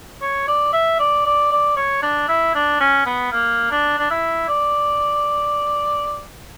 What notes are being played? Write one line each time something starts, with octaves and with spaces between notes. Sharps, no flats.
C#5
D5
E5
D5
D5
D5
C#5
D4
E4
D4
C#4
B3
A#3
D4
D4
E4
D5